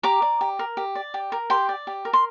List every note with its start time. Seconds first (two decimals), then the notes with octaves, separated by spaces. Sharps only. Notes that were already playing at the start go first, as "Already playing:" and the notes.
0.03 G4 A#5 D6
0.22 D5
0.41 G4
0.59 A#4
0.77 G4
0.95 D5
1.14 G4
1.32 A#4
1.50 G4 G5 C6
1.69 D5
1.87 G4
2.05 A#4
2.13 C6